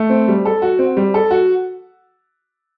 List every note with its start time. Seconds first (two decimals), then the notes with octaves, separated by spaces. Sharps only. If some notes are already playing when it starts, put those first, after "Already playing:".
Already playing: A3
0.10 C4
0.28 G3
0.45 A4
0.62 F#4
0.79 C4
0.97 G3
1.14 A4
1.31 F#4